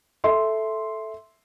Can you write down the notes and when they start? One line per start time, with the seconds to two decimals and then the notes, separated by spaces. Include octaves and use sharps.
0.24 A4 E5 C6